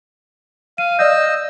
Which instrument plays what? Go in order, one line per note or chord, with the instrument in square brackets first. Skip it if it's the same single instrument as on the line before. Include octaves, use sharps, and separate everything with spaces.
[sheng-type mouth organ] F5 [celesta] D#7
[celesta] D5 F5 G6 [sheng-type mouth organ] D#5 E6